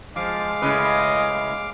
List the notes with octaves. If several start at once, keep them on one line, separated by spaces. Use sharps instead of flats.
F3 G#3 F5 D6
A2 C#3 B4 D#5